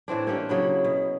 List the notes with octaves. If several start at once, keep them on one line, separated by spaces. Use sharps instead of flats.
A2 E3 C4 D4
A#3 C#4 D4 G4
C#3 F#3 E4
B2